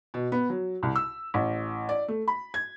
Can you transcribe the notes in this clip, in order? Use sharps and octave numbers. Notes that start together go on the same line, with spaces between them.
B2
B3
F#3
C2
E6
A1
D5
A3
B5
G#6